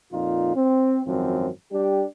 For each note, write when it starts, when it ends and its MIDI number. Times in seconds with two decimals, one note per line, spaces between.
0.13 0.52 41
0.13 0.52 46
0.13 0.52 63
0.13 0.52 65
0.56 1.00 60
1.06 1.49 32
1.06 1.49 42
1.06 1.49 53
1.06 1.49 60
1.72 2.04 55
1.72 2.04 62
1.72 2.04 67